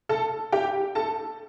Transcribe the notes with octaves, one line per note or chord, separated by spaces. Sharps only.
A4 A5
G4 G5
A4 A5